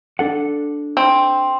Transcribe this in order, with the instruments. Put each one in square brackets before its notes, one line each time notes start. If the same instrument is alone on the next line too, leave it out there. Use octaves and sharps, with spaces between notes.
[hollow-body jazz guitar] D4 A4 F#5
[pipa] C4